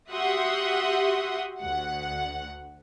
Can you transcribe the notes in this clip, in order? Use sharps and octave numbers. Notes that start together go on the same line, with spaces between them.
F#4 G4 E5 F#5 C6 D#6
D2 F#5